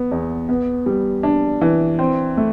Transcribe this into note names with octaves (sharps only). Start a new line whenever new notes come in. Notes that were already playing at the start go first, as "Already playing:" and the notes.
Already playing: B3
E2
B3
G3
D4
E3
C4
A3